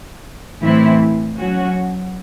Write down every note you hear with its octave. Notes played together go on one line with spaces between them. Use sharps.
A2 E3 C4 E4
F#3 C#4 F#4